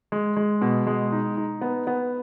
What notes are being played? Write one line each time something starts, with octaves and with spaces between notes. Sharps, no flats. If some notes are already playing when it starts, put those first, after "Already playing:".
G#3
G#3
B2
G#3
D#4
D#4
B3
B3